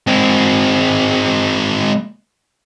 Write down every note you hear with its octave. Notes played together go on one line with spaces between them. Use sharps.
G#3 C4